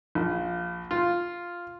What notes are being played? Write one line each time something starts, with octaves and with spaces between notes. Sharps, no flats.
A#1
F4